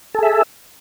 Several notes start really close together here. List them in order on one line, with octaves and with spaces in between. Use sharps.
A4 G#4 E5